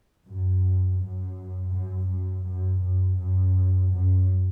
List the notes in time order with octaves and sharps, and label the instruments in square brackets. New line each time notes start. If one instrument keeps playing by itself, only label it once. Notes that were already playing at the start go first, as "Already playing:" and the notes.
[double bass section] F#2
F#2
F#2
F#2
F#2
F#2
F#2
F#2